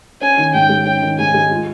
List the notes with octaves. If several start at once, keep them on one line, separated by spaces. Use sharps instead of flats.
C#4 G#5
D#3
G#2 G5
G#3
C#4 G5
D#3
G#2 G#5
G#3
F4